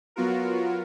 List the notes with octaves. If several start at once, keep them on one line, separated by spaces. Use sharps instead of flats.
F#3 B3 F4 F#4 A#4